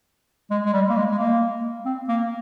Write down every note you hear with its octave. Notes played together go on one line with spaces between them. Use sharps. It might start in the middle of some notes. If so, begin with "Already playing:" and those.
G#3
G#3
G3
A#3
G#3
G#3
A#3
C4
A#3